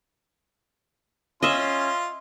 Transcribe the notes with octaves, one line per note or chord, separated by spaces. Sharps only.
C#4 F4 D#5 E5 C6